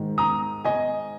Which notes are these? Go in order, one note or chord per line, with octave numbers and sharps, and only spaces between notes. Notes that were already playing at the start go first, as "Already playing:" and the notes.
Already playing: G#2 D#3
A#5 D#6
D#5 G#5